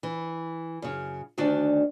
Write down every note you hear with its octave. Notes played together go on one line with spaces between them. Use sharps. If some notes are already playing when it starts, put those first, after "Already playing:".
E3
F#2 C#3
D2 D#3 C#4 D4 F#4 D5